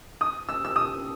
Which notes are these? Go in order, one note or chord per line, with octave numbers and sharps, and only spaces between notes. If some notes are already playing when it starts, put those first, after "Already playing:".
D#6
E6
E6
D#6